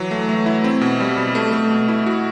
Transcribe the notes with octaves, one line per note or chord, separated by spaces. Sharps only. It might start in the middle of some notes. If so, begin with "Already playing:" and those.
Already playing: E3 F#3
A3
A3
E4
C4
B2
G3
B2
A3
A3
B2
E4
F#4